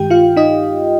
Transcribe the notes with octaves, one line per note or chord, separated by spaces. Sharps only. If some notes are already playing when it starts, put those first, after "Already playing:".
Already playing: G2 D#3 G#3 G4 G5
F4 F5
D#4 D#5